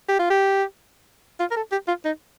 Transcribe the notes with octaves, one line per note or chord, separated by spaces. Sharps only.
G4
F4
G4
F4
A#4
A4
G4
F4
D#4